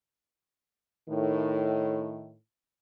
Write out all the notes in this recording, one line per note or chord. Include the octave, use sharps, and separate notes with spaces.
A2 D#3